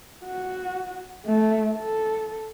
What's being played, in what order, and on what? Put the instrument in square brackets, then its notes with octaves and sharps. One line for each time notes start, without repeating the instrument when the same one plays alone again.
[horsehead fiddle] F#4
A3
A4